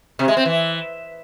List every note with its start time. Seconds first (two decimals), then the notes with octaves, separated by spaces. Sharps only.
0.19 C3
0.28 G#3
0.37 C4
0.46 E3